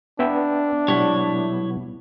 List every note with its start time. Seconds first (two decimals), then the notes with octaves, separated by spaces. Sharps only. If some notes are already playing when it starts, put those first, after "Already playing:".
0.19 B3 D4 E5 G5
0.88 B2 F#3 G3 B3 E4 C#5